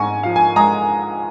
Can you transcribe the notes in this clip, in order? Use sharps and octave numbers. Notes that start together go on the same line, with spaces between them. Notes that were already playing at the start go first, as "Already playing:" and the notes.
Already playing: G#2 G#3 G#5 A#5 C#6
F3 F5
G#5
G#3 A#5 D#6